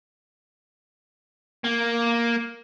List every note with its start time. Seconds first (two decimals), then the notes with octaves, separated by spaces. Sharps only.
1.64 A#3